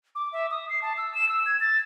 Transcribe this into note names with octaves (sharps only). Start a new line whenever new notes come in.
D6
E5
D#6
C7
A5
E6
E7
E6
G#6
A6